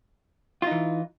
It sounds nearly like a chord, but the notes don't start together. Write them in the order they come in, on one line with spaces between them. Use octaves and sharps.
F4 D#4 E3